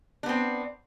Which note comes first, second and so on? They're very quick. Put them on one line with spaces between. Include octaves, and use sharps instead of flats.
D4 B3 C4